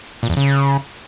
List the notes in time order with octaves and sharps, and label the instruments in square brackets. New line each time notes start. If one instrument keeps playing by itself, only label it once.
[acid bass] A#2
E2
C#3